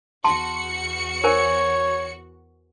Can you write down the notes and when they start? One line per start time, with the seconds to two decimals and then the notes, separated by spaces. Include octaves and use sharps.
0.24 E2 F#4 A5 C6 C#7
1.24 A#4 C5 C#5 G#5